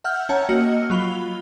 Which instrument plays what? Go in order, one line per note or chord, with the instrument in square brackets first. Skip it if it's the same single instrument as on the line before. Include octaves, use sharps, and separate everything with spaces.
[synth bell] E5 F#5 E6 F6 G6
C#4 C#5 F#5 G5 A5 A#5
A#3 F#4 D#5 E6 F6 C#7
F#3 F4 B5 F7 G7